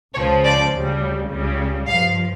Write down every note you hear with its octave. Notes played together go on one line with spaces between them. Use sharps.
C#2 C#3 F3 C#5
D5
D2 C#3 G3
C#2 C#3 G3
G2 F3 F5